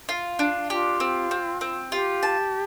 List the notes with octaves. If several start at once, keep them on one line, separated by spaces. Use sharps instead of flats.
F4
D4
F4 G4
C4
C4
C4
F4 G4
A5